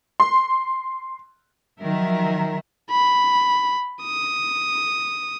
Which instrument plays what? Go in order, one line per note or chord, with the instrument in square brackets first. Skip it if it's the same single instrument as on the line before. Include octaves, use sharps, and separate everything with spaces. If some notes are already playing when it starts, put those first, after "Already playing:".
[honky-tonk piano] C6
[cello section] D#3 F3 F#3 A#4 E5
[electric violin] B5
D#6